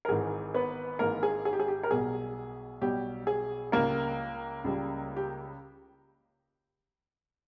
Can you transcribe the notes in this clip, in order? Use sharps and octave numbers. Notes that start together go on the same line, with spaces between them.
A#4
G#1 G#2 E3 G#4
B3 B4
G#1 G#2 E3 A#3 A#4
G#4
G#4
G4
G#4
G4
A#4
B1 B2 G3 G#4
B1 B2 G3 G4
G#4
C#2 C#3 G3 A#3 A#4
C#2 C#3 G3
G4